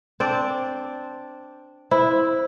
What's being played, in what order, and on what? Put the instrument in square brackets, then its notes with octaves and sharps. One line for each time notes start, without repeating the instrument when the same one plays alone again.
[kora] C4 D4 D5
[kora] E4 [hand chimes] C5